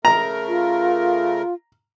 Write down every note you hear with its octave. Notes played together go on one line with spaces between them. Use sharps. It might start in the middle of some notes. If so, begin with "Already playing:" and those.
C#3 A3 A#4 A#5
F4